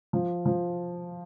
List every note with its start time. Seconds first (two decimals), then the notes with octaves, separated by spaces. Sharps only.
0.13 F3
0.46 F3